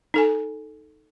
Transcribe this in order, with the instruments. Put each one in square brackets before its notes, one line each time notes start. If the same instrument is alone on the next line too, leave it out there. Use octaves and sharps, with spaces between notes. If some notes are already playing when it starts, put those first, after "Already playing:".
[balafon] D#4 A4 G#5